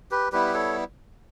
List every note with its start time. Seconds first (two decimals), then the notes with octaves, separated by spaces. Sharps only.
0.11 G4 B4
0.32 G3 B3 E4 G4 B4
0.54 A4 C#5